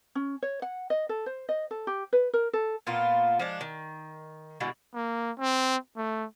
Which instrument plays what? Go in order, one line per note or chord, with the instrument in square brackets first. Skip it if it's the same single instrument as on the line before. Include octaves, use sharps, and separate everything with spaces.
[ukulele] C#4
C#5
F#5
D#5
A4
C5
D#5
A4
G4
B4
A#4
A4
[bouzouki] A#2 A#3 B3 F4
F3 G#3 D4
D#3
B2 D3 E3 G#3
[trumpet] A#3
C4
A3